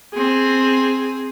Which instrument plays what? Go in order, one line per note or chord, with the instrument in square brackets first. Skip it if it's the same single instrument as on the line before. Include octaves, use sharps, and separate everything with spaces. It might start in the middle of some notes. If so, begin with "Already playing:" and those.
[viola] C4 G#4